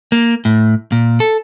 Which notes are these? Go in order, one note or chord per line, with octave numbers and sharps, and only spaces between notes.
A#3
A2
A#2
A4